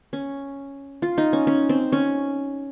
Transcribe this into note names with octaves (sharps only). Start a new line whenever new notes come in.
C#4
F4
D#4
C#4
C#4
C4
C#4